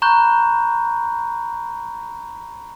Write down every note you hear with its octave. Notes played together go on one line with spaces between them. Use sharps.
A#5 B5 C#6 F#6 G6